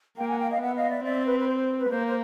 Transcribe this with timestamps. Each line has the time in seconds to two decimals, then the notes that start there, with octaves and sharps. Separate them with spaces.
0.18 A#3 F5 G5
0.28 F#5 G#5
0.39 F5 G5
0.50 D#5 F5
0.61 B3 E5 F#5
0.75 D#5 F5
0.90 D5 E5
1.04 C4 D5 E5
1.26 B4
1.39 B4
1.47 C5
1.58 C5
1.79 B4
1.90 A#3 C5
2.07 C5